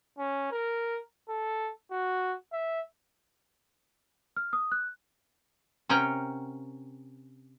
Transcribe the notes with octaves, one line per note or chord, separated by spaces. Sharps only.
C#4
A#4
A4
F#4
E5
F6
D#6
F#6
C3 C#4 A#4 F#5 G5 A#5